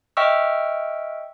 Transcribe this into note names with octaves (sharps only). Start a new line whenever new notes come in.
D#5 E5 G5 C#6 E6 F6